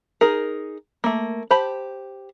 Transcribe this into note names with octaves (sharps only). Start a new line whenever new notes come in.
D#4 G#4 A#4
A3 A#3
G4 C5 A5 B5